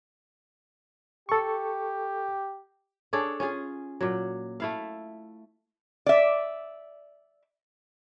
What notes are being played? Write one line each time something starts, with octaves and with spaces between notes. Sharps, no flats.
G4 A4 C#6
D4 G#4 A4 C#5
C#4 F4 G#4
A#2 F#3
A3 E4 F5
D5 E5